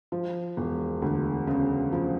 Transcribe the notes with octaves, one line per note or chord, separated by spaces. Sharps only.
F3
E1
D2
C#3
F3